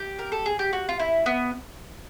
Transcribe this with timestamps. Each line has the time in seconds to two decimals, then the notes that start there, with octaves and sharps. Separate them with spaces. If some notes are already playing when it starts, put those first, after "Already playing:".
Already playing: G4
0.19 A#4
0.32 A4
0.46 G#4
0.59 G4
0.73 F#4
0.89 F4
1.00 E4
1.26 B3